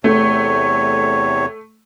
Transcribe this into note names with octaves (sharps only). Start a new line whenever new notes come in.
E2 C3 A3 C#5